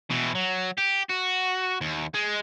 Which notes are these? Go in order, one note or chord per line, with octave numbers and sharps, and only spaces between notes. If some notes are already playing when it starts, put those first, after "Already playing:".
B2 E3
F#3
G4
F#4
D#2
G#3